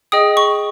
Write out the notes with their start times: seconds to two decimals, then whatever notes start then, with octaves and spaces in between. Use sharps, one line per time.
0.12 G#4 D#5 G5 D#6
0.37 C#6